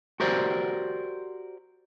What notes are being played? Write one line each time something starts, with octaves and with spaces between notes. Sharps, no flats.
F#4 G4 A#4 C5 D5